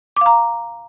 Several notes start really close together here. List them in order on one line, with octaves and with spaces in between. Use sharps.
D6 F5 A#5